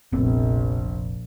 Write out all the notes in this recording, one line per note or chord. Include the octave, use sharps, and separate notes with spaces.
F1 A#1 B3 C4